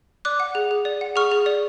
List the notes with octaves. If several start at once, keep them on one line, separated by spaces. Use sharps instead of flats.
D5 D6 F#6
F#5
G#4
G#4
D5
F#5
G#4 C#6 F6
G#4
D5